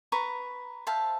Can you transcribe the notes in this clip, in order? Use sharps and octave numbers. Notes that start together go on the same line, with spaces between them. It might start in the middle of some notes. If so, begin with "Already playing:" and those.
B4 A#5 C#6
C5 E5 F5 A5